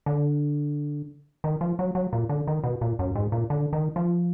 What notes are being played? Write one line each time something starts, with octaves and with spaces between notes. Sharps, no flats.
D3
D#3
F3
F#3
F#3
A#2
D3
D#3
B2
A#2
F#2
G#2
A#2
D3
D#3
F3